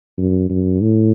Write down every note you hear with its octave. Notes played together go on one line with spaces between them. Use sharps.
F#2
F#2
A2